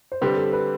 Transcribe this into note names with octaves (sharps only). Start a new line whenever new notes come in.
C5
D3 G3 C4 G4 B4
A4
B4